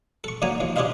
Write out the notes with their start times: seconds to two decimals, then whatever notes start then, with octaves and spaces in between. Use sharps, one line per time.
0.24 A4 C#6
0.42 D3 F#3 A#3 G#5 A#5 D#6
0.60 D#2 F3
0.76 D4 G4 G#4 C5 D#5 F5